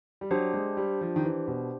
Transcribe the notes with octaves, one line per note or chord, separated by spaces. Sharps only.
G3
F#3 D4 G4 C5
G#3
G3
F3
D#3
E3
B2